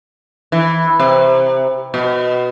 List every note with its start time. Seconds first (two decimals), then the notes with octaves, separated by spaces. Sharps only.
0.52 E3
0.99 C3
1.94 B2